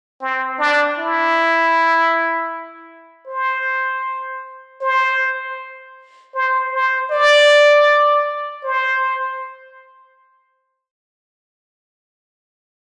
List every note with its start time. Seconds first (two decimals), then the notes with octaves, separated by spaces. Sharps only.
0.22 C4
0.59 D4
0.98 E4
3.27 C5
4.81 C5
6.35 C5
6.73 C5
7.11 D5
8.63 C5